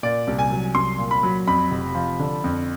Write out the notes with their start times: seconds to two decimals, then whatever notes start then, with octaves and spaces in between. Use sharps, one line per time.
0.03 A#2 D5
0.27 C2
0.39 G#5
0.51 F#3
0.75 C2 C6
0.98 A#2
1.11 B5
1.23 F#3
1.47 F2 B5
1.71 F1
1.95 F3
2.19 D3
2.44 F2